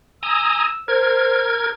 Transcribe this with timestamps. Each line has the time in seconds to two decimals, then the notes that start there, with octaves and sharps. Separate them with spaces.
0.23 G#5 A#5 D#6 E6
0.88 A#4 C5 G#6